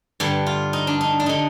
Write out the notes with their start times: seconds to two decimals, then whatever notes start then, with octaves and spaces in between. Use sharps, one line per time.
0.20 G2 D3 G4
0.46 F4
0.73 D#4
0.87 D4
1.01 D#4
1.20 D4
1.26 D3 D#4